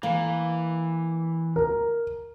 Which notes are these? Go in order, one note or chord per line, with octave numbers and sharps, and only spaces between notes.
E3 A#3
A#4